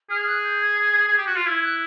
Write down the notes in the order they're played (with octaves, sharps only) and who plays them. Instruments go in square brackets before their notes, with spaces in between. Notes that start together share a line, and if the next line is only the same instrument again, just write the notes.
[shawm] G#4 [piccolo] F6
[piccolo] F#6
G6
G#6
[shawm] G#4
G4
F#4
F4
[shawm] E4 [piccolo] G#6
[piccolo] F#6